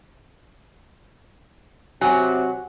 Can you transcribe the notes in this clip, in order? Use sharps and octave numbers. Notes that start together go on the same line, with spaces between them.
C3 F#3 G#5